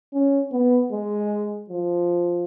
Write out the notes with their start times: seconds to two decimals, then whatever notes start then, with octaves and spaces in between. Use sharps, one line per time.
0.13 C#4
0.52 B3
0.92 G#3
1.70 F3